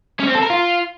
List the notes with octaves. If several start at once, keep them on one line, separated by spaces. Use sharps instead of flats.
C#4
C4
A4
A#4
F4